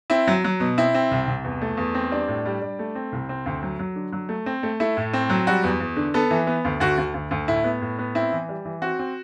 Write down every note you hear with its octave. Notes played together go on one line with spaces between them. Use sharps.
C4 E4
F#3
F#3
B2
C4 E4
C4
C2
C2
E2
A3
E2
C4
G3 D4
A2
G3
G3
A3
C4
C2
C4
D2
F#3
F#3
D3
F#3
A3
C4
A3
A3 E4
A2
C4
F#3
G3 F#4
E2
E2
D3
B3 A4
E3
B3
D2
D2 F#4
D2
D2
D2
A2 E4
B3
A2
B3
C4 E4
E3
G3
E3
C4 F#4
C4